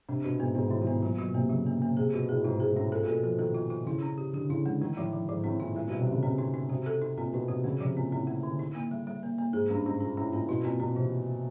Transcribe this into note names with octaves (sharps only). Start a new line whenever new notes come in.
C3 D4
B2 D4
G#2 B3
G#2 B3
A2 D#3
G#2
B3
A#2 F#3
A#2
B2 F#3
C3 A#3
C#3 F#3
A#3
A#3
C3 G#4
B2 F4
A2 G#4
G#2 F4
G#2 G#4
G#2
A2 C#4
A#2 A4
A#2
B2 A4
F3 A4
D#3 A4
F4
F4
C#3 E4
C#4
G4
D3 G4
C#3 E4
D3 G#3
D#3 A3
A2 F3
F3
G#2 F3
A2 C4
A#2 E4
A#2 G3
B2 G3
C3
G3
C#3
C3 C4
D#4
D#4
C3 F#4
A4
D#4
A#2 C4
B2 D#4
C3 F#4
C#3 A3
C3 F3
A#2 C4
A2 C4
A3
D3
D#4
A#3
G3
G3
A#3
A#3
G#2 G#4
G2 C#4
G#2 C#4
A#2 C#4
A2 C#4
A#2 C#4
B2 E4
A#2 C4
B2 C4
C3 E3